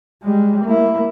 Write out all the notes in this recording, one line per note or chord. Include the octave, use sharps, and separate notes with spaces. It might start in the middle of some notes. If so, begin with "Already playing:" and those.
G3 G#3
A#3 E4